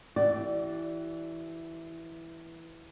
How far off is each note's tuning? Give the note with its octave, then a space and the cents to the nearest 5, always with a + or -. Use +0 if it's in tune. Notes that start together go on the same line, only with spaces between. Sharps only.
E3 +0 G4 -45 D5 +0